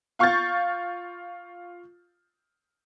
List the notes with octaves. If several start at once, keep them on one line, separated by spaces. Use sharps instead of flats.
F4 F5 C#6 F6 G6 A6